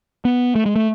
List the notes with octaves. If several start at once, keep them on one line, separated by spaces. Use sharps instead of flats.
B3
A3
G#3
A3